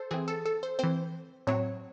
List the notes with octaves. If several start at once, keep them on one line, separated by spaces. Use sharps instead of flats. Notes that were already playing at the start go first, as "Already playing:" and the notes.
Already playing: A4 C5
E3 C4 G#4
A4
A4
C5
E3 C4 C5
A2 F#3 C4 C#5